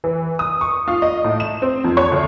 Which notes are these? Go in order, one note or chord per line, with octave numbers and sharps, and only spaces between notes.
E3
D#6
C#6
F4
D#5
A2
E7
C4
F2
C#5
D2